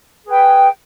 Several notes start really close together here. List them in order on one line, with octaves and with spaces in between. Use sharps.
G#4 B4 G5